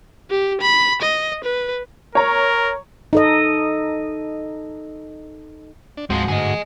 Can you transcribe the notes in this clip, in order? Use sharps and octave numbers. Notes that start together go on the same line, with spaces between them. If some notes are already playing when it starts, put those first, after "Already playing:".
G4
B5
D#5
B4
A#4 C#5 A#5
D#4 A4 D#5
D4
D2 G#2 F3 G#3 C4 F#4
D2 G2 G#4 D#5